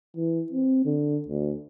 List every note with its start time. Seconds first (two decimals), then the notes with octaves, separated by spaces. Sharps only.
0.17 E3
0.52 C4
0.85 D3
1.28 D2